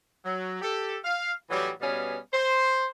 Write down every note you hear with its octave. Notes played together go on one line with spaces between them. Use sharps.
F#3
G4 A4
F5
A2 E3 F#3 G3
B2 G3 B3 C#4 G#4 F5
C5